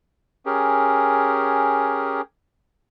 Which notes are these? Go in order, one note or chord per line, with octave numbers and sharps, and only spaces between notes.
C#4 G4 G#4 A#4